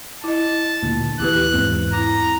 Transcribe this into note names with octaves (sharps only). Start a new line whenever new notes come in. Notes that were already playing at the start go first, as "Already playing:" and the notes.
E4 D#5 A5
D2 A#2
E2 E4 G4 B4 F#6
E2 G#2 C4
E4 A#5